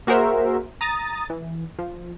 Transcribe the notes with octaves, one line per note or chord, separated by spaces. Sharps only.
A#3 F#4 G#4 A#4 C5 E5
A#5 D#6 A6
E3
F3